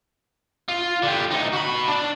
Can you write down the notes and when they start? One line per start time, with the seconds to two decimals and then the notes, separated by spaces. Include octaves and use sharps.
0.69 F4
1.03 D3 G3
1.31 D2 D#4
1.52 F#4 B5
1.88 D4